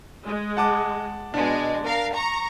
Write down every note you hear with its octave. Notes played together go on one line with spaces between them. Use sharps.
G#3
F#5 A5 D6
B2 G#3 D4
A#4 F5
A#5 C#6